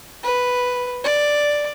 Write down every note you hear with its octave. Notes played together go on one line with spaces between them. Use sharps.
B4
D5